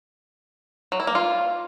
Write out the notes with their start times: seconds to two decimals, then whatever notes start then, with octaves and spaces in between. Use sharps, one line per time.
0.92 F#3
1.00 E4
1.07 A#3
1.15 F4